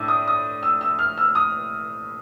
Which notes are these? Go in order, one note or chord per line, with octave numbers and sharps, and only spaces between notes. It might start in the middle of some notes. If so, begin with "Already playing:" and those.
Already playing: A2 D4 D6 E6
D#6
D#6
E6
E6
F6
E6
D#6